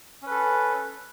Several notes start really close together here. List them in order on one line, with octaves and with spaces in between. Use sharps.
C#4 B4 A4